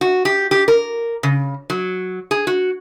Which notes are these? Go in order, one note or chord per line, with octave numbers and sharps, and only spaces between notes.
F#4
G4
G4
A#4
C#3
F#3
G#4
F#4